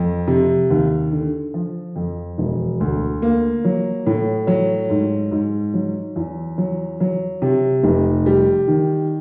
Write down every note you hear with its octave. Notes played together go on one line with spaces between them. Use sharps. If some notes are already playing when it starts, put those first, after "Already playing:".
Already playing: F2
C3
D#2
D3
F3
F2
E1
D2
A#3
F#3
A2
F#3
G#2
G#2
F#3
E2
F#3
F#3
C3
F1
G3
D#3